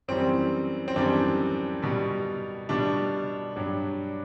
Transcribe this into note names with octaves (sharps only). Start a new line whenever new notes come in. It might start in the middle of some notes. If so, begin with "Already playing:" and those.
F#2 E3 G3 C4
C4
F#2 E3 G3 D4
B2 G3
B2 G3 D4
G2 F#3